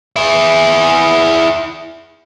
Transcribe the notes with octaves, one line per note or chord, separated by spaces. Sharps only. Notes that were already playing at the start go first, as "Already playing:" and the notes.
E4 G#4